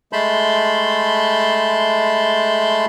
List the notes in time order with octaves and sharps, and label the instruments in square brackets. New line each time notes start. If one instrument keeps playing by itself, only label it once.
[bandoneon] G#3 A3 A5 B5 C6 G6